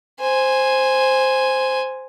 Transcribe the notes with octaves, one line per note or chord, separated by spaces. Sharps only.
C5 G#5